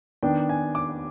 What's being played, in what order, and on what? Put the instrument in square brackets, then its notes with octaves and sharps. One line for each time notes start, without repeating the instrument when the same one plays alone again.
[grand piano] D#3 B3 D4 G5
G#5
D6